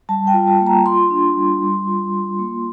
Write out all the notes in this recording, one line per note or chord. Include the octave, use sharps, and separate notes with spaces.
G3 A5
G5
F4
A5
A#3
A#5
F4 C6
D4
G3
G3
F4
F4
A#3